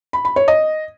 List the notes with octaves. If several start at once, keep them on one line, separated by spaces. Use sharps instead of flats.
B5
B5
C#5
D#5